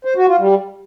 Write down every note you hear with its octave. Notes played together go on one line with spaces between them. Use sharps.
C5
F#4
F4
G3